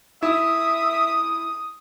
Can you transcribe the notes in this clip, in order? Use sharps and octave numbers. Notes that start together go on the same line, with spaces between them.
E4 E5 D#6